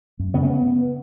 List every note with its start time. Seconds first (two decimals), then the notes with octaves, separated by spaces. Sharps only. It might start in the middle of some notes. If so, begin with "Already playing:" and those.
0.19 F#2
0.34 C#3 B3
0.42 A3
0.50 B3